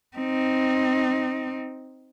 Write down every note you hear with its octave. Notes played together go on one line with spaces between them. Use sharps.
C4 D#4